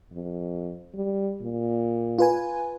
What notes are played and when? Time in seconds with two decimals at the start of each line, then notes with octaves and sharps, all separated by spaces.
0.13 F2
0.95 G3
1.42 A#2
2.19 F4 B4 G#5